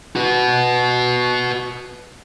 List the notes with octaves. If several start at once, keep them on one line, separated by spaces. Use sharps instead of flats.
F#4 B4